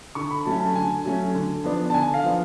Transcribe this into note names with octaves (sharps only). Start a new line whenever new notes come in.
D3 C#6
B5
F#3 A3 C#4 A5
A5
D3 G#5
F#3 A3 C#4
D3
F3 B3 D4
A5
D3 G#5
F5
F3 B3 D4